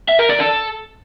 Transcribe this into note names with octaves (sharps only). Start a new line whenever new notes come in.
E5
A#4
D5
A4